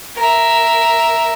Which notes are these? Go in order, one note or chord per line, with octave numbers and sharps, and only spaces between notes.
A#4 E5